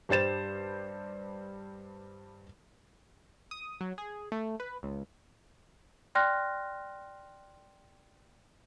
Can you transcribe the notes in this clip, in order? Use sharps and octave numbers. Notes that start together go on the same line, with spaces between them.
G2 G3 C5 A6 E7
D#6
F#3
G#4
A3
B4
C#2
D5 G5 C6 F6 F#6 A#6